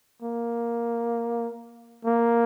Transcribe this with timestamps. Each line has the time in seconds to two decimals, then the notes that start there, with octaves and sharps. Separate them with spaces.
0.22 A#3
2.05 A#3